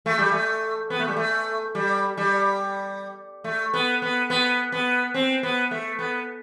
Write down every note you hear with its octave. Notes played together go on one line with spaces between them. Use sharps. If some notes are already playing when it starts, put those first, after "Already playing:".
A3
G3
A3
B3
A3
G3
A3
G3
G3
A3
B3
B3
B3
B3
C4
B3
A3
B3